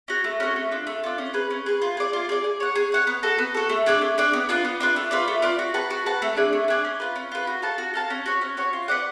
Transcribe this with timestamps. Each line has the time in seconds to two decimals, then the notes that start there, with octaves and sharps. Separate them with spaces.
0.08 C#4 F#4
0.24 A3
0.40 C#4 F#4
0.56 A3
0.71 D4 F4
0.87 A3
1.04 D4 F4
1.18 C#4
1.34 G#4 B4
1.51 C#4
1.66 G#4 B4
1.81 F4
1.97 G#4 D5
2.13 F4
2.29 G#4 D5
2.44 G#4
2.60 C#5 F#5
2.76 G#4
2.92 C#5 F#5
3.07 B3
3.23 F#4 A4
3.38 B3
3.54 F#4 A4
3.69 A3
3.86 D4 G#4 D5
4.02 A3
4.18 D4 G#4 D5
4.33 B3
4.49 D4 F4 B4
4.65 B3
4.80 D4 F4 B4
4.96 A3
5.11 F4 B4 D5
5.28 A3
5.42 F4 B4 D5
5.59 F#4
5.74 B4 F#5 A5
5.90 F#4
6.06 B4 F#5 A5
6.22 A3
6.37 D4 G#4 D5
6.53 A3
6.68 D4 G#4 D5
6.85 C#4
7.00 F4 B4
7.16 C#4
7.32 F4 B4
7.47 F#4
7.62 A4 F5 A5
7.78 F#4
7.94 A4 F5 A5
8.10 C#4
8.26 F#4 C#5
8.41 C#4
8.57 F#4 C#5
8.73 F4
8.88 B4 D5 F#5